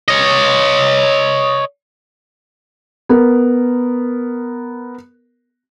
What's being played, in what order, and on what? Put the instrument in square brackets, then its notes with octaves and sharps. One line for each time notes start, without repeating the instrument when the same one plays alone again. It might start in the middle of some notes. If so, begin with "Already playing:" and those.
[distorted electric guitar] C#5 D#5
[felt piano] B3 A#4